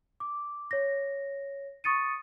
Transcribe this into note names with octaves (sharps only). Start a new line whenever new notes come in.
D6
C#5 A#6
C#6 D#6 A6 C#7 D#7